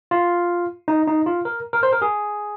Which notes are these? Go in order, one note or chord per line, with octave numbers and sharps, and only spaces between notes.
F4
D#4
D#4
F4
A#4
A#4
C5
A#4
G#4